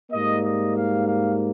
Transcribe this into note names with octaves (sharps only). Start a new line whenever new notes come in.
G#2 G3 A#3 D#5
D#5
F5
F5